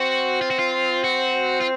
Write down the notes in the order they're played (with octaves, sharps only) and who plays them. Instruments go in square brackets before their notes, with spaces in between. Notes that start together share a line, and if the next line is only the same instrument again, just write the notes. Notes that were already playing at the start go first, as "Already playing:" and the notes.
Already playing: [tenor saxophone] C4 [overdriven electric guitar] F#4
[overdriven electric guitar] F4
F#4
F4
F#4
F4